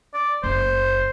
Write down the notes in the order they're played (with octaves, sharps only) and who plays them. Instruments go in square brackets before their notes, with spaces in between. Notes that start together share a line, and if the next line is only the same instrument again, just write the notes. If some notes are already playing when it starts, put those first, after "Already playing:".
[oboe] D5
[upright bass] F#1 [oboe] C5